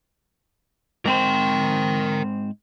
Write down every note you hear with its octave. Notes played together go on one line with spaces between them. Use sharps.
G#2 C4 A#4 C5 G5